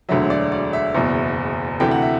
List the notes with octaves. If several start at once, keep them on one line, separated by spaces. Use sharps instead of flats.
E1 D2 D3 F#3 E5
D5
D5
E5
F#1 E2 B2
D2 C3 E3 A3 G5
F#5
E5